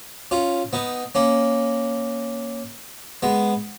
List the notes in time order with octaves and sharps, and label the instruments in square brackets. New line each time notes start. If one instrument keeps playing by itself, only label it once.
[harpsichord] C#4 F4
B3 D#4
A#3 C#4
G#3 B3